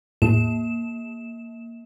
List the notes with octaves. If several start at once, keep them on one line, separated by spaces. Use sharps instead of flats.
E2 A2 A#3 E7